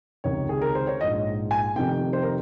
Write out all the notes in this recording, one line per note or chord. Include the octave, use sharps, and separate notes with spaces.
C#2 C3 D#3 C#5
G#4
A#4
C5
C#5
A#1 G#2 F3 D#5
G#5
F1 F2 C3 D#3 G5
C5
A#4